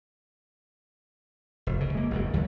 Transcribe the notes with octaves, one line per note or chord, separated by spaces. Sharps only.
F1
D2 C#3
G#3 A#3
F#1 E2 G2
D#2 F#3